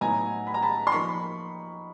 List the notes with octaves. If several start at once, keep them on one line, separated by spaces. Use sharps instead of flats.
A2 F#3 B3 D#4 G#5 A#5
B5
A#5
A5 B5
C6
F3 A#3 D#4 B5 C#6